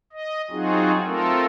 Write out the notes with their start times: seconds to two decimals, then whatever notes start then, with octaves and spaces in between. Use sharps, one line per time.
0.13 D#5
0.50 F#3 C4 D#4 F4 F#4 G#4
1.05 A3 C4 F4 A4 A#4